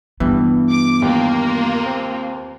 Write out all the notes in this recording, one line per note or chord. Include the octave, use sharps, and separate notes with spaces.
G2 E3 B3
D6
D#2 A#3 F4
C4